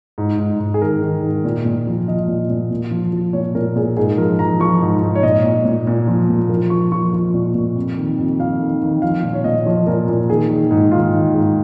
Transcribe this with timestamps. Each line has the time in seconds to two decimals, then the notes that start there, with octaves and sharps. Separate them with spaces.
0.18 G#2
0.38 G#2
0.59 G#2
0.74 G#4
0.82 D#3 A#4
1.02 D#3
1.23 G#2
1.45 A#2
1.65 A#2
1.87 F3
2.08 F3 D#5
2.28 A#2
2.50 A#2
2.71 A#2
2.91 F3
3.13 F3
3.33 A#2 C#5
3.55 A#2 A#4
3.76 A#2 G#4
3.97 G#2 G#4
4.18 F3 A#4
4.39 F3 A#5
4.60 F3 C#6
4.81 G#2
5.02 G#2
5.15 C#5
5.23 A#2 D#5
5.44 A#2
5.65 A#2
5.87 A#2
6.07 F3
6.29 A#2
6.49 F3 A#4
6.70 F3 C#6
6.92 F3 C#6
7.13 F3
7.34 A#2
7.54 A#2
7.76 F2
7.97 D#3
8.18 F2
8.40 F2 F5
8.61 D#3
8.82 D#3
9.02 F3 F5
9.23 A#2
9.34 C#5
9.44 A#2 D#5
9.65 F3 C#5
9.87 A#2 A#4
10.08 A#2
10.29 D#3 G#4
10.49 D#3
10.71 G#2
10.92 D#3 F4
11.14 D#3
11.34 G#2